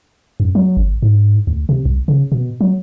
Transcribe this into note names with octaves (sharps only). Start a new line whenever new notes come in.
F#2
F#3
G1
G#2
D2
C3
C2
C#3
B2
F#3